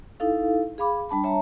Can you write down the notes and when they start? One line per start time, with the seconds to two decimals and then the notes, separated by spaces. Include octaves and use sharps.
0.20 D#4 E4 A4 F5
0.78 G#4 F5 B5 D6
1.09 G3 D4 A5 B5
1.24 C#5 E5 A5 A#5